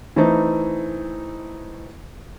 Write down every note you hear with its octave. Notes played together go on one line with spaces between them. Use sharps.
E3 A3 C4 D#4